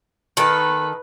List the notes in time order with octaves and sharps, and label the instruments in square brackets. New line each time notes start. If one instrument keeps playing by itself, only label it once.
[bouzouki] D#3 A4 [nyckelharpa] B4